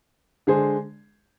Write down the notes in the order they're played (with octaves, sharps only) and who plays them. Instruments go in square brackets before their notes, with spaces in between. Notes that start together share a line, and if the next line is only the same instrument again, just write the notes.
[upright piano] D3 G#3 D4 G#4 C5